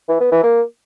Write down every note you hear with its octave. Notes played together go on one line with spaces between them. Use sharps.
E3
B3
E3
A#3